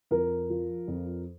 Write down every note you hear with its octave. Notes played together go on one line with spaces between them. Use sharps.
F2 A#4
F3
F2